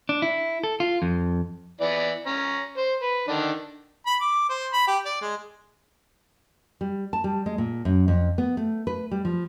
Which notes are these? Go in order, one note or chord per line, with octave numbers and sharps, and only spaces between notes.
D4
E4
A4
F4
F2
E3 B3 D5
C#4 A#5
C5
B4
D3 D#3 D4
B5
D6
C5
B5
G4
D5
G#3
G3
A5
G3
G#3
A#2
F#2
F2
B3
A3
B4
G3
F3